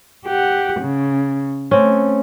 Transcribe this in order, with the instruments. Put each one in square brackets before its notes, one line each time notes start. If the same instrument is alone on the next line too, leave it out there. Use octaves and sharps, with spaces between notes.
[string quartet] G4 F#5
C#3
[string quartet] A3 [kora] C4 C#4